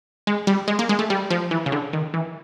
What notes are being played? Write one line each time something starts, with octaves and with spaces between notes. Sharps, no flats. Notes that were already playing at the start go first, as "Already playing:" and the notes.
G#3
G3
G#3
A#3
G#3
A3
G3
F3
E3
C#3
D3
D#3
E3